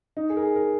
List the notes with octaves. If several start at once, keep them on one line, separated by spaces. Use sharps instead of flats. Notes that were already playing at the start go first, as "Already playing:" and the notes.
D#4
G#4
A#4
G#4
A#4